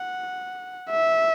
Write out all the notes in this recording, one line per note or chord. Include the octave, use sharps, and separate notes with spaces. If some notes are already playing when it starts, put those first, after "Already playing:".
Already playing: F#5
E5